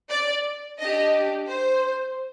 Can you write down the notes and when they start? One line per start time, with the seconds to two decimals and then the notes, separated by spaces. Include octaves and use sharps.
0.09 D5
0.78 D4 G4 D#5
1.48 C5